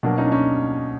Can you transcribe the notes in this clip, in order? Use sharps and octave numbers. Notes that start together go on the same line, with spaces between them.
B2 F#3 A#3 D4
C#4 D#4
D4
C#4 D#4